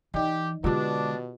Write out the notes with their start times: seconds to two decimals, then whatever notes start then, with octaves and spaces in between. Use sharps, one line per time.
0.14 E3 D#4 G4 D5 D#5
0.64 B2 D3 G#3 D4 F4 G4 B4